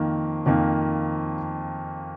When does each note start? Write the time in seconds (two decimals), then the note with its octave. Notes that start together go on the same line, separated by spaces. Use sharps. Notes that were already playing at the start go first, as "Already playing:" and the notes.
Already playing: F2 D#3 A#3
0.46 F2 D#3 A#3